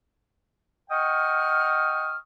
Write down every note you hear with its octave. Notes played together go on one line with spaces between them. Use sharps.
D#5 F#5 G5 C#6 D#6 F6